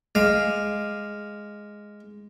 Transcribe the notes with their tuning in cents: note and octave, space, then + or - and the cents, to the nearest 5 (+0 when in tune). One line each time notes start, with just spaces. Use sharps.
G#3 +0 F5 +0 D6 +20